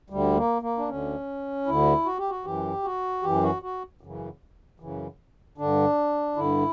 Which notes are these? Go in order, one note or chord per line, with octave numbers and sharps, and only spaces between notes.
D2 D3 G3
A#3
A#3
D4
D2 D3 C#4
D2 D3 E4
F#4
G4
F#4
F#2 E3 G4
F#4
F#2 E3 G4
F#4
F#4
F#2 C#3 E3
F#2 C#3 E3
G2 D3 D4
G2 D3 E4